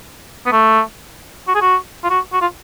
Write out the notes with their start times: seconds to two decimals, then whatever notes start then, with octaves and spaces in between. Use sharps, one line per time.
0.46 B3
0.52 A3
1.48 F#4
1.55 G#4
1.61 F#4
2.04 F4
2.10 F#4
2.33 F#4
2.41 F4